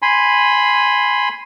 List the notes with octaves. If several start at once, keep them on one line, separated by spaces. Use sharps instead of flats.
G#5 B5 C6